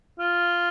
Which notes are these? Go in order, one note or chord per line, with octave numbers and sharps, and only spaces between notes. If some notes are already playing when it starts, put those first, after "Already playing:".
F4